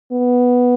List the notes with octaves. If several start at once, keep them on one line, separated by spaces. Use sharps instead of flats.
B3